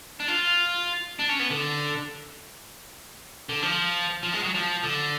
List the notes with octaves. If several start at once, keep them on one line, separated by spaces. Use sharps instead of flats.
D4
F4
D4
C#4
B3
D3
D3
F3
F3
G#3
F#3
F3
D3